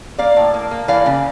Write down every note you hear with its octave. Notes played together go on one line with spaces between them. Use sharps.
A#3 D5 F5
A2
A#3
A#3
E3 D5 F5
C#3